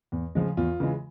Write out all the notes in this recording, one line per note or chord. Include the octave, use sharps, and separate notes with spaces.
E2
C#3 F3 G#3
E2 F4
C#3 E3 G#3